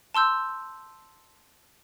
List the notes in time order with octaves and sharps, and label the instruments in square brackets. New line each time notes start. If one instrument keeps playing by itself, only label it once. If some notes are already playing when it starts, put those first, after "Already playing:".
[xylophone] A5 C6 E6 G6